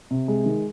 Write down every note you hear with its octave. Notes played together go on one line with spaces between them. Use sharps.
C3
G#3
D#3